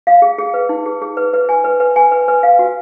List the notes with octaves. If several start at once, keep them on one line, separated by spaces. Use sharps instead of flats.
F5
G#4
G#4
B4
D#4
G#4
G#4
B4
B4
G#5
B4
B4
G#5
B4
B4
F5
F#4